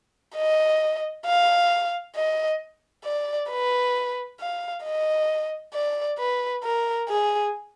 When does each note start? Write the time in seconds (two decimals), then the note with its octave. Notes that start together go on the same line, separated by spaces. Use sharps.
0.36 D#5
1.26 F5
2.16 D#5
3.05 D5
3.50 B4
4.40 F5
4.84 D#5
5.74 D5
6.18 B4
6.63 A#4
7.09 G#4